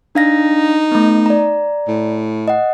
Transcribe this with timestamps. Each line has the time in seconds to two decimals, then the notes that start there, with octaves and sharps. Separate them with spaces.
0.15 D4 D#4 F5 A#6
0.92 A3 B3
1.26 D5 A#5
1.88 A2
2.48 D#5 F#5